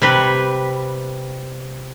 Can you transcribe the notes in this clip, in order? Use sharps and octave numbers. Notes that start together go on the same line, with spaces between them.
C3 G3 B4